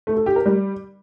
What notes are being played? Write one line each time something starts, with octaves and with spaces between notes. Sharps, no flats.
A3
A4
G4
A#4
G3